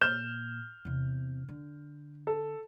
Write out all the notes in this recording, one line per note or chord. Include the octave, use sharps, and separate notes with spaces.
A#2 F6 G6 E7
E2 C3
D3
A4